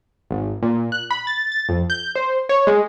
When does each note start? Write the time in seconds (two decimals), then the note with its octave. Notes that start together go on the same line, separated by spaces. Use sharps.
0.31 G#1
0.63 A#2
0.92 F#6
1.11 B5
1.27 A6
1.52 A6
1.69 F2
1.90 G6
2.16 C5
2.49 C#5
2.67 G#3